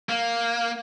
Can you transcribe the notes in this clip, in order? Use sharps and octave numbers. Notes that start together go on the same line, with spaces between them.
A#3